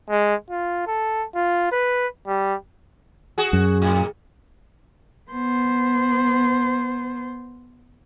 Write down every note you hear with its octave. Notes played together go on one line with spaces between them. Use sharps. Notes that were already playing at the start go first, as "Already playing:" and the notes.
G#3
F4
A4
F4
B4
G3
F#4 G#4
F#2
A2
B3 C5